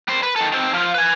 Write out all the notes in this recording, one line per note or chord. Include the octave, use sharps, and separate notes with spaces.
G3 C5
B4
D#3 A4
D#3 C4
F3 F4
B4 G#5